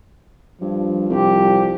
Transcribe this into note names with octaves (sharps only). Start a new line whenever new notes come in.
G2 F3
C2 G4